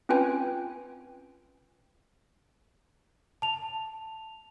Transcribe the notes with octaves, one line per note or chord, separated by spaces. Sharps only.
C4 C#4 F4 B4 G5 G#5
A5 F7